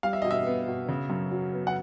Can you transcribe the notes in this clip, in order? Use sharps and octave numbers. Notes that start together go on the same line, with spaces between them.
G3 F5
E5
B2 D#5
E5
B3
B2
C#3
F#2
F#3
B3
F#5